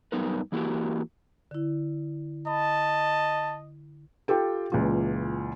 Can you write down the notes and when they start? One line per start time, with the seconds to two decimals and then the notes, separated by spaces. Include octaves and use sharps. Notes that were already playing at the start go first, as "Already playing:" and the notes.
0.12 G2 F#3 B3 D#4 A#4 B4
0.52 E3 A#3 E4 F#4 G4 A#4
1.51 D3 E4
2.47 D#5 A5 B5
4.28 F4 G4 A4 G5
4.72 C#2 A#2 E3 F4